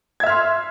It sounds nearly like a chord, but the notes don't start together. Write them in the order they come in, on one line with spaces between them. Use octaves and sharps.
G#6 E5 F6 C6